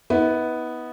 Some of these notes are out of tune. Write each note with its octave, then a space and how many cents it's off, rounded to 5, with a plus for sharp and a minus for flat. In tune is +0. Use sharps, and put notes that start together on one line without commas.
B3 +0 E4 -45